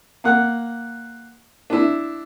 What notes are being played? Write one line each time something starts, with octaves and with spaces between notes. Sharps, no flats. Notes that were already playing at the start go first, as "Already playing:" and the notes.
A#3 F#5
D4 E4